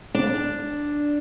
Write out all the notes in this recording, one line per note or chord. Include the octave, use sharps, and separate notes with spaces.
D4